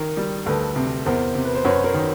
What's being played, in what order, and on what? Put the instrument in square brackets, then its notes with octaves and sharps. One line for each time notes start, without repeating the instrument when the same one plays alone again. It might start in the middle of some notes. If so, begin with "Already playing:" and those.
Already playing: [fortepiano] D#3 [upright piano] A#4
[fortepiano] G3
[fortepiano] D2 [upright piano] A4 B4
[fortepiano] C3
[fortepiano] E2 [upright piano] A#4 C5
[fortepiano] C3
[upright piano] B4
C5
[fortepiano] F#2 [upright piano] B4 C#5
[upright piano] A#4 C5
[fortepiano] D#3